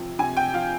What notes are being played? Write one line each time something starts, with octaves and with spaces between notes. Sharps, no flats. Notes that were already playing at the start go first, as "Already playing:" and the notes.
Already playing: C3 F3
C3 G#5
G5
F3 F5